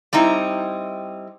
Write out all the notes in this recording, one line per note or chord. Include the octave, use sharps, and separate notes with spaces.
G3 C4 D#4 E4